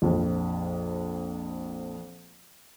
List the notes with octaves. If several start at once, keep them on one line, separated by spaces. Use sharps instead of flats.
A#1 F2